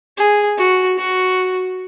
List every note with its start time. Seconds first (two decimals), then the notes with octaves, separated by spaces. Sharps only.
0.17 G#4
0.58 F#4
0.98 F#4